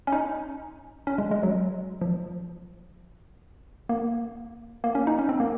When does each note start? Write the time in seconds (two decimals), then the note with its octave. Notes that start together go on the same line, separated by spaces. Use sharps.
0.07 C#4
0.12 D#4
1.07 C#4
1.18 G#3
1.31 G#3
1.43 F#3
2.01 F3
3.89 A#3
4.84 A#3
4.95 C#4
5.07 D#4
5.19 C#4
5.29 C4
5.40 A#3